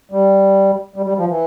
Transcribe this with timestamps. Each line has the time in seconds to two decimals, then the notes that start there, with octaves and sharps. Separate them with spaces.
0.12 G3
0.96 G3
1.06 G3
1.18 F3
1.29 E3